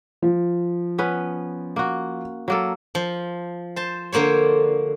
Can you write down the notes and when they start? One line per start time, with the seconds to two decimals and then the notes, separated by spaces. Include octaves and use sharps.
0.22 F3
0.98 B3 C#4 B4
1.76 A#3 F#4
2.48 F#3 A#3 A4
2.95 F3
3.76 C5 A5
4.12 D3 A#3 C5 C#5